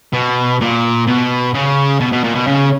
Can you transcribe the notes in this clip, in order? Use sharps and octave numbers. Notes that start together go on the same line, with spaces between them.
B2
A#2
B2
C#3
B2
B2
A#2
B2
C#3